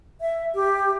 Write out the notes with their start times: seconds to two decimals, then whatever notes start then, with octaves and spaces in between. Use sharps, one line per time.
0.21 E5
0.55 G4